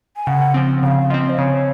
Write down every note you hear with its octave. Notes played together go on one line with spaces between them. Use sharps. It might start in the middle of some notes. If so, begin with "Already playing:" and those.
G#5
C#3 F#5
F3 C4
C#3 F5 F#5
F3 C4 D#5
C5
C#3 C#5